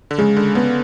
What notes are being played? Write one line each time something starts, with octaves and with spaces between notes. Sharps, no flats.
D3
C#3 G#3
D3
C#3 B3